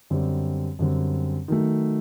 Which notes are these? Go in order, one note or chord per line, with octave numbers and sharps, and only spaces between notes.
F#2 D3 G3 C4
F#2 D3 G3 C4
D#3 F#3 A3